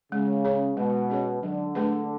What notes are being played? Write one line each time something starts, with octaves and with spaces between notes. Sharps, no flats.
C#3 G#3
C#4 G#4 C#5
B2 G#3
C#4 G#4 C#5
D3 F#3
A3 D4 G#4 B4